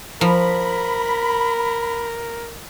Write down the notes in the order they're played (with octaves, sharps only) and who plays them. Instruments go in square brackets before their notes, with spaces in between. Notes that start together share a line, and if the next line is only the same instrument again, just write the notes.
[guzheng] F3 [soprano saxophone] A#4 [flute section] B5